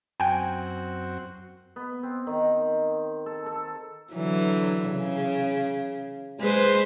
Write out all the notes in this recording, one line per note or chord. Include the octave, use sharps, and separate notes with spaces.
F#2 C4 F#4 G5 G#5
B3
C4
D#3
A4
A4
D3 E3 F#3
C#3
G#3 B4 C5